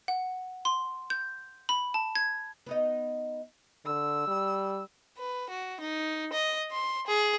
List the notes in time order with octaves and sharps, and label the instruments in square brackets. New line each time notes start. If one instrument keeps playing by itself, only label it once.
[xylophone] F#5
C6
G6
B5
A5
G#6
[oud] B3 D#4 D#5
[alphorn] D3 [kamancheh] E6
[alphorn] G3
[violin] B4
F#4
D#4
D#5
C6
G#4